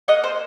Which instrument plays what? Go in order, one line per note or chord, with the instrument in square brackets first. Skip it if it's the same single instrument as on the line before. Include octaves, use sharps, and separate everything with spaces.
[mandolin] A#3 D#5 F#5
C5